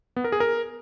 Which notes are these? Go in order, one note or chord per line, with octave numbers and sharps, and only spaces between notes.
B3
A#4
G#4
A#4